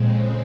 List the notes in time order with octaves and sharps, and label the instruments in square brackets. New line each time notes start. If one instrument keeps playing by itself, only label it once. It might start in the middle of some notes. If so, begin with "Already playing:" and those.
Already playing: [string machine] F2 C#3 G#3 C4 [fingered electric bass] A#2